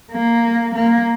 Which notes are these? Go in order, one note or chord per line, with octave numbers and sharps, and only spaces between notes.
A#3
A#3